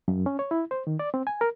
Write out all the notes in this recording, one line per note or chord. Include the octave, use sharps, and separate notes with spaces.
F#2
C#4
C#5
E4
C5
D#3
D5
C4
G#5
A#4